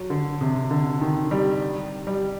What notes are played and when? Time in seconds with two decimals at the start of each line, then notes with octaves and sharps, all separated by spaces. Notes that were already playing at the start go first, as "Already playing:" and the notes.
Already playing: F#3
0.10 D3
0.41 C3
0.71 D3
1.01 D#3
1.31 G3
2.07 G3